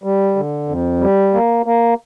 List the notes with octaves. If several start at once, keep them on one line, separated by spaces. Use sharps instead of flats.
G3
D3
F2
G3
A#3
A#3